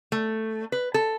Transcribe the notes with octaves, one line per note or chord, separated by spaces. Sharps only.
A3
B4
A4